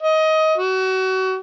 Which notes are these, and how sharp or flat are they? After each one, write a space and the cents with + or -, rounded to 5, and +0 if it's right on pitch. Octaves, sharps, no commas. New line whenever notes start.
D#5 +20
F#4 +30